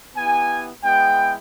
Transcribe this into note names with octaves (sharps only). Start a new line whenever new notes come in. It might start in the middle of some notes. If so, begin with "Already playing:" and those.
B3 E4 G4 G#5
G#3 B3 E4 G5